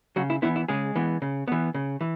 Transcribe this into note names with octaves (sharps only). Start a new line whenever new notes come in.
C#3 F#3 F#4
E4
E3 B3 E4
E4
C#3 G#3 G#4
E3 B3
C#3
E3 B3
C#3
E3